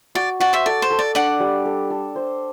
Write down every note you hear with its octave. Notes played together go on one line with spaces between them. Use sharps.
F#4 D5
F#4 D5 F#5
C5 E5
A4 D5
C5
A4
D5
D4 D5 F#5
G3
A4
A4
C5